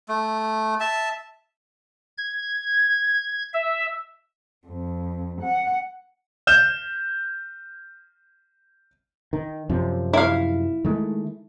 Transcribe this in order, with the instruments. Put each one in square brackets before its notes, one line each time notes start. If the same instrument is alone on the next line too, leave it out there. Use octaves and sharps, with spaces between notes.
[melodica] A3
E5 A5
[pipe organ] G#6
E5
[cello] F2
F#5
[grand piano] F6 G6 E7
[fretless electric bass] D#3
F#2 C3 F3
[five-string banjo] E4 F5
[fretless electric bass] D#3 G#3 A3